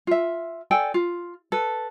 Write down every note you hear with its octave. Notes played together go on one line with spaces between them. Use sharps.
F4 E5
A4 D5 G5 G#5
F4
A4 B4